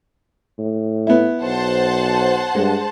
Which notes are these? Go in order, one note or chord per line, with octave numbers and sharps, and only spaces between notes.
A2
B3 E4
B1 C5 F#5 A5
G2 G#3